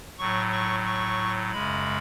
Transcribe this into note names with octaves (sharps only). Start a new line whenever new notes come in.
A2 F#3 C#6
C#6
C#6
F#2 C#3 G#3 B5